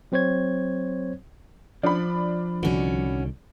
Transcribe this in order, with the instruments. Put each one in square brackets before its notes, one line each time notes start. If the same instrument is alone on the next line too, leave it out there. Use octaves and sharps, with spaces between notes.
[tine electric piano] F#3 C4 C5 C#5 G#6
[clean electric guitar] F3 [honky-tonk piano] D4 B5
[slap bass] C2 D3 D#3 [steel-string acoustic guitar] C#4 F#4